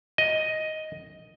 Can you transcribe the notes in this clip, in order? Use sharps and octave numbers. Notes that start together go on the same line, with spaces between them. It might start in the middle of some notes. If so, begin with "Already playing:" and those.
D#5